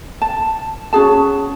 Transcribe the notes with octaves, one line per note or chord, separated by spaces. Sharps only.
A5
C#4 F#4 G#4 A5